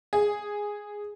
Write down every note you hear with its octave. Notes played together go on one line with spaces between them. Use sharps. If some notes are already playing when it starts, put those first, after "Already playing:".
G#4